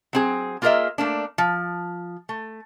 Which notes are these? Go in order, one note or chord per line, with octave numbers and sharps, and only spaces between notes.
F#3 C4 G#4
A#3 F4 G#4 A#4 D#5 E5
A3 A#3 D4
F3
A3